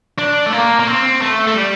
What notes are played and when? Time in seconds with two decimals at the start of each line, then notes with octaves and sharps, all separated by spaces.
0.18 D4
0.46 A3
0.52 A#3
0.80 A#3
0.87 C4
1.22 A3
1.47 A3
1.55 G3